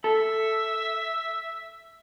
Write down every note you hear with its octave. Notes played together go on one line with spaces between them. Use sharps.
A4 E5